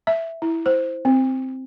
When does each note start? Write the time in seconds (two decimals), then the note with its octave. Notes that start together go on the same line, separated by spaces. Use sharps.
0.07 E5
0.42 E4
0.66 C5
1.05 C4